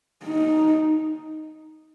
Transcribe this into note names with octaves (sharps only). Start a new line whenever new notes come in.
D#4